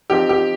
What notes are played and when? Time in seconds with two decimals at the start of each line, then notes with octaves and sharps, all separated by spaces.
0.10 F3 C4 D#4 G4
0.29 G4